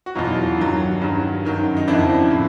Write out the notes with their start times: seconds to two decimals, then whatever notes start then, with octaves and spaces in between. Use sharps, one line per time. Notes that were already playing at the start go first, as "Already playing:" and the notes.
0.06 F#4
0.15 E2 B2 F#3 D#4 F4
0.58 G2 D#3 F#3
1.02 G2 D#3 F#3
1.45 F#2 D#3 F#3
1.77 D#4
1.88 F2 C#3 F3 D4 E4
2.31 A2